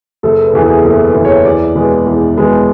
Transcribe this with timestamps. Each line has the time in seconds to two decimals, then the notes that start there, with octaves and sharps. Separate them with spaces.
0.23 F#1 A4
0.44 B4
0.53 E2 B2
0.64 G#4
0.84 F#1 A4
1.04 B4
1.14 E2 B2
1.25 C#5
1.45 E2 D5
1.75 B2 G#3 B3
2.05 E2
2.36 B2 G#3 B3